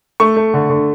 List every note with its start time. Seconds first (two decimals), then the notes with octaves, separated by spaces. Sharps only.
0.20 A3 C#6
0.36 A3
0.54 D3
0.70 D3